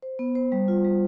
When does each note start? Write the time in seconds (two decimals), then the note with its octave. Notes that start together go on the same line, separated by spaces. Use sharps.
0.02 C5
0.19 B3
0.35 C5
0.52 G3
0.68 F4
0.85 G3